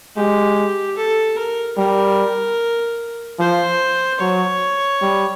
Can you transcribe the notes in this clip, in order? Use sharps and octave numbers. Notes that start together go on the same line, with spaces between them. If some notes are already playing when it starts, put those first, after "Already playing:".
G#3 G4
A4
A#4
G3 A#4
F3 C5
F#3 C#5
G3